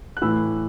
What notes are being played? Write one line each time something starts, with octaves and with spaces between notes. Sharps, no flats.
F#6
A2 E3 B5 E6